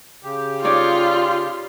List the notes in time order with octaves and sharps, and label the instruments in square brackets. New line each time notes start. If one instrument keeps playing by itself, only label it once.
[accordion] C#3 G4
[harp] D#4 C#5 D5 [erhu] F4